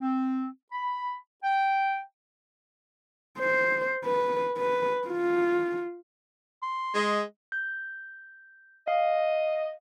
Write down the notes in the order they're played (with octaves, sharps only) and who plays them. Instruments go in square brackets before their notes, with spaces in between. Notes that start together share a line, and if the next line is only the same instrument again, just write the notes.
[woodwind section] C4
B5
G5
[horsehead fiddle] C5
B4
B4
F4
[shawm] C6
[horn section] G#3 D#5
[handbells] G6
[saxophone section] D#5 [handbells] F5